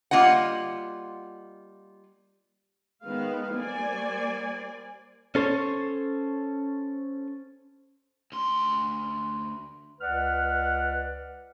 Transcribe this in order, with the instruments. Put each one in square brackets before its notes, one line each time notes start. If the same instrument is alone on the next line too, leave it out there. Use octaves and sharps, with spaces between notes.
[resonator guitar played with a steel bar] G3 A#3 F4 D#5 F#5
[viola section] D#3 G#3 B3 B4 F5
G3 A#3 C5 D5 G#5
[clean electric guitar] C#4 A4 C5 C#5
[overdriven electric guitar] D2 C6
[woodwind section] C#2 B4 D5 F#5 F6